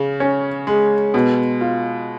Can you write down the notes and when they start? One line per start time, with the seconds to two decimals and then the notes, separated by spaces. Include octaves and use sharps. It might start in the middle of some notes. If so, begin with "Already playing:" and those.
Already playing: C#3
0.20 C#4
0.67 G#3
1.14 B2
1.61 F4